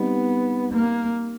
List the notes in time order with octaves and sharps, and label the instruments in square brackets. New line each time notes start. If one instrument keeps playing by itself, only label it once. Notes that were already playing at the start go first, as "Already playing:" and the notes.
Already playing: [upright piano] G3 C4 D#4 G4 [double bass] B3
[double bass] A#3